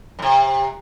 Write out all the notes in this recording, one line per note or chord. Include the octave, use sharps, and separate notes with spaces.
F#2 C3